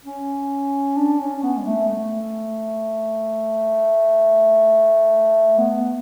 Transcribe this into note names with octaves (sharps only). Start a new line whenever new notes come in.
C#4
D4
C#4
B3
G#3
A3
A3
B3